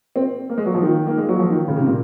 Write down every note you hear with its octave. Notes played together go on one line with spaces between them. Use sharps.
C4
A#3
G#3
F#3
F3
D#3
A#3
G#3
F#3
F3
D#3
C#3
C3
A#2